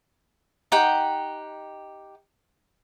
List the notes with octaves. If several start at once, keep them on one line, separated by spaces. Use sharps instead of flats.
D#4 G4 F#5 G5